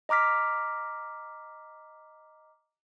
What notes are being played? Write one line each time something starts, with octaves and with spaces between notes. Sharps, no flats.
D#5 A#5 D6 F6 B6